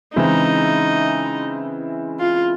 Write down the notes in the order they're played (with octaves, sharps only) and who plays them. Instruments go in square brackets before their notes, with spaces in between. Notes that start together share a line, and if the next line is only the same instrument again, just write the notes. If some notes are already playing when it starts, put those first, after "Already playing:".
[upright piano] C#3 E3 G#3 C4 E4 [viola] D#4
[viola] F4